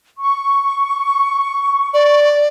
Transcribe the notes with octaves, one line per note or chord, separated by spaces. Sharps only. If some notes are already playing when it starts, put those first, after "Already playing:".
C#6
D5